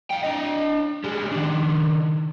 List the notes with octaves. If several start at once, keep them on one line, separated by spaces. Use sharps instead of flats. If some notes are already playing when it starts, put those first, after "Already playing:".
F5 G5
D4 D#5
G3 G#3
D#3 D4